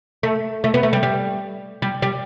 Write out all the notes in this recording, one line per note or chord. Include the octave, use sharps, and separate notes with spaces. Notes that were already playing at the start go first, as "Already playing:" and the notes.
A3
A3
B3
A3
G3
G3
G3
G3